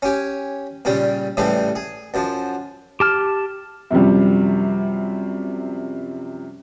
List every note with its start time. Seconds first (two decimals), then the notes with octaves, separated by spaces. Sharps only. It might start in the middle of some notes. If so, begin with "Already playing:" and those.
0.02 C#4 G4 G#5
0.85 A#2 C#3 G3 C#4
1.37 A2 C#3 E3 G3 A3
1.76 G#4
2.14 F#2 F3
3.00 G4 A5 F6
3.90 F#2 C3 F3 G3